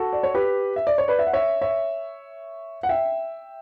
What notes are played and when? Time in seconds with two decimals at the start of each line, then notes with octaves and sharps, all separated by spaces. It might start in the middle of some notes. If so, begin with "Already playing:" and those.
Already playing: F#4 A4
0.13 D5
0.23 C#5
0.34 G4 B4
0.76 E5
0.87 D5
0.98 C#5
1.08 B4 D5
1.19 E5
1.27 F#5
1.33 C#5 E5
1.61 C#5 E5
2.83 F#5
2.89 E5 G5